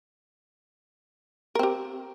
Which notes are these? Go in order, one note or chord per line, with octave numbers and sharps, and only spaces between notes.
C4 G4 A#4